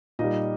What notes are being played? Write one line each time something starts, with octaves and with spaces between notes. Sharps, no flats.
A#2 G3 D#4 D#5